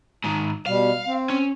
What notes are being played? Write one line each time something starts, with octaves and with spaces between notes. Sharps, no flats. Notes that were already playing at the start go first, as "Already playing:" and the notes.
G#2 D#3
B2 G3 F5
C4
C#4